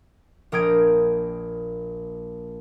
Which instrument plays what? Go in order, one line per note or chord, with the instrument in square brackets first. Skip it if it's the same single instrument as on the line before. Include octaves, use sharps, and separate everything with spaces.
[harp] A#1 A#4 G5 D#6 G#6 D7